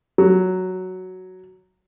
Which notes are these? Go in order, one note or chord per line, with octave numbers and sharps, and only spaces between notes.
F#3